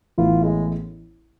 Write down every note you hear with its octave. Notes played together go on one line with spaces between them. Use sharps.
A1 A2 E3 B3 E4 F4
G#3